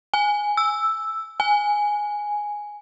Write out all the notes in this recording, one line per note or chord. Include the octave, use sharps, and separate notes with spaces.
G#5
E6
G#5